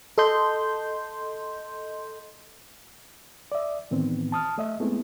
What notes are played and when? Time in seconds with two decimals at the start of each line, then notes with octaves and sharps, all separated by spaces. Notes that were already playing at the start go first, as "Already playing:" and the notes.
0.18 A4 D#5 C6 G6
3.52 D5 E5
3.91 A2 D#3 E3 B3 C4
4.32 A5 D#6 F6
4.58 A3 D#5 E5
4.80 G#3 A3 B3 C4 E4